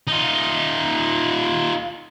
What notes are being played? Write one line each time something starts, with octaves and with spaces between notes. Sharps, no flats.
D#4 F4